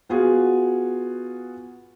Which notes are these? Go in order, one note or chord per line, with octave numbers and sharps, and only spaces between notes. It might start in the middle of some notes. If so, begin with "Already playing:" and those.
B3 F4 F#4 G#4